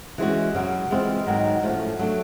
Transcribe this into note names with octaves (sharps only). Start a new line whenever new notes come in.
E3 G#3 C#4 F#4
F#2 C#3 F#3
E3 G#3 C4 F4
G#2 D#3 F#3
A2 F3 A3 C#4 F#4
F#3 A3 D4